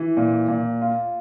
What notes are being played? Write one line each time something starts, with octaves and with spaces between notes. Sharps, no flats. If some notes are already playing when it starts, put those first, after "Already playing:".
Already playing: E3
A#2
A#2
F4